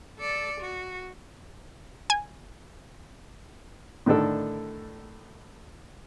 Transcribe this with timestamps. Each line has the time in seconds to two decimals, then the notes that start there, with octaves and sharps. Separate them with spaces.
0.20 A4 D5
0.61 F#4
2.10 G#5
4.06 A2 D3 D#3 D4 A4